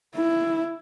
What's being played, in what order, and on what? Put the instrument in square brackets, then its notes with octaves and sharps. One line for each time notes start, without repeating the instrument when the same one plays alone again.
[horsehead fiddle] E4